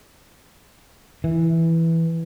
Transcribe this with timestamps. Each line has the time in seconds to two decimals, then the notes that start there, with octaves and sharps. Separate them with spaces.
1.24 E3